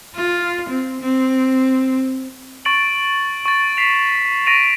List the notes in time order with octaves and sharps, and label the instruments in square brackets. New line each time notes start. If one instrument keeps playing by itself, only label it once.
[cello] F4
C4
C4
[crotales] C#6 A6 D7 F#7
C#6 A6
B6 C7 E7 F7
C#6 A#6 D7 D#7 F7